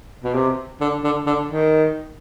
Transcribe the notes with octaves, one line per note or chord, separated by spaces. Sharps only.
B2
C3
D3
D3
D3
D#3